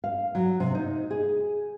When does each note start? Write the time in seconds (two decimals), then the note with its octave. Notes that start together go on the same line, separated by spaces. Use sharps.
0.04 F5
0.35 F#3
0.60 C3
0.75 D#4
1.11 G#4